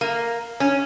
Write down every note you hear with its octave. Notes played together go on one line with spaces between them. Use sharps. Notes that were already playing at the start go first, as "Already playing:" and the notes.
A#3
C#4